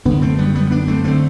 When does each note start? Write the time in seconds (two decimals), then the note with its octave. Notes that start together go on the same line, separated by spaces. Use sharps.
0.05 F#2 D3 B3 D4
0.22 A3 C4
0.38 G3 B3
0.55 G3 B3
0.71 B3 D4
0.88 A3 C4
1.04 D3 A3 C4